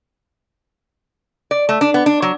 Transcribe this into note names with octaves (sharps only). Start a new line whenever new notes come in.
D5
A3
D4
B3
D4
F#3